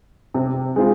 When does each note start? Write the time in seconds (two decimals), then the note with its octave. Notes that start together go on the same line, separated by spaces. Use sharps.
0.34 C3
0.76 G#3 C4 F4